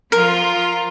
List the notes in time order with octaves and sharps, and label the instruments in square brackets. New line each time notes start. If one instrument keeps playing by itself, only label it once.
[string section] F3 F4 [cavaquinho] A#4